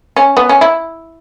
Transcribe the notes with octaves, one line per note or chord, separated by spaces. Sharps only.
C#4
B3
C#4
E4